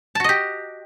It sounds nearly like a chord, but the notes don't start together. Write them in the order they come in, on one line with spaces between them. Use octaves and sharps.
A5 F#4 D#5 G4